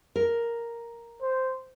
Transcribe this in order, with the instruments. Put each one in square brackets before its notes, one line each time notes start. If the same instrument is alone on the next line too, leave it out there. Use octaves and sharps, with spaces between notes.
[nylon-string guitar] A#4
[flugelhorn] C5